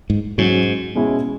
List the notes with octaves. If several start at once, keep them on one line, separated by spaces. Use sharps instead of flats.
G#2
G#2 F#3 C#4 F#4
B2 G#3 C#4 E4